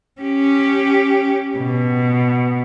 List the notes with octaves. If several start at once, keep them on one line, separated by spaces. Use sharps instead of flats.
C#4 G4
B2